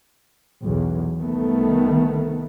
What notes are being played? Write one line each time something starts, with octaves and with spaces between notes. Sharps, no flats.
B1 E2
C2 D#3 A3 B3